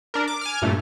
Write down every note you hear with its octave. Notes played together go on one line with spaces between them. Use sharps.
D4 A#4
D6
G#5 D6 F6
G2 A#2 A3